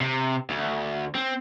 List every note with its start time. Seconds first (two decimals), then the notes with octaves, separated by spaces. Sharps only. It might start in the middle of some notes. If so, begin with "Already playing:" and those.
0.01 C3
0.50 D2
1.15 C4